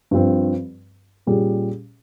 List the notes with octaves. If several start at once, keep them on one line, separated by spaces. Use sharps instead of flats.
G2 F3 C4
A#2 G3 C#4 G#4